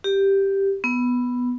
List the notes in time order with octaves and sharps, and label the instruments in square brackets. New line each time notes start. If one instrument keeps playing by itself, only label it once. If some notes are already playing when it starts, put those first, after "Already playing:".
[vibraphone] G4
B3